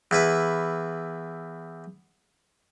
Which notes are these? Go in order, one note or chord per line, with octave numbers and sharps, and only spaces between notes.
E2 E4 B4 E5